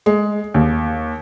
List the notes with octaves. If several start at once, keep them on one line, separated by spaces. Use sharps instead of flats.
G#3
D#2